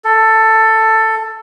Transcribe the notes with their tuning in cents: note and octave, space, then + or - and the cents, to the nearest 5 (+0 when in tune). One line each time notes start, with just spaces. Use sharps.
A4 +10